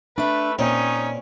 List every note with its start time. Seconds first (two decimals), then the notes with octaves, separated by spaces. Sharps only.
0.18 A3 D4 B4 E5
0.59 A#2 C4 C#4 D#4 C#5 D#5